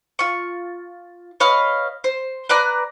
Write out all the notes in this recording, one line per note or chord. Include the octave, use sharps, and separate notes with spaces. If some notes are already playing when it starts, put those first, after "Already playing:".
F4 C#6
B4 C#5 D#5 F5
C5
B4 D5 A#5 F#6